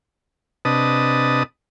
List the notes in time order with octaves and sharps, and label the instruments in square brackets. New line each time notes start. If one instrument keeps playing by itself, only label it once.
[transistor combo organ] C3 D4 B4 D#5 A5 D#6